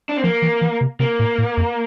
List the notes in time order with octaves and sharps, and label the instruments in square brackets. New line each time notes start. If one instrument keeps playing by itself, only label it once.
[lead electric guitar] D4
C4
[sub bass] F3 [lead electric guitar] A#3
[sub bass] E3
E3
C3
[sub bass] C3 [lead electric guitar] A#3
[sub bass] A2
A2
F2